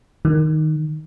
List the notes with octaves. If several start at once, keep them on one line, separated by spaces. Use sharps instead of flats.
D#3